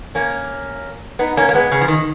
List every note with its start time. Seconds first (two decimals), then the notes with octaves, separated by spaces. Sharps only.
0.15 A#3 C#4
1.19 B3 D#4
1.37 A#3 C#4
1.49 A#3
1.54 G#3 B3
1.72 C#3
1.81 F3
1.88 D#3